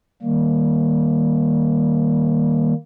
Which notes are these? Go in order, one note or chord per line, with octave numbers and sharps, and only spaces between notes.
D#3 G3 A#3